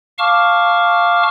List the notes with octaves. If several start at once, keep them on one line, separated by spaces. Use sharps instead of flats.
F5 A5 C#6 D6 F6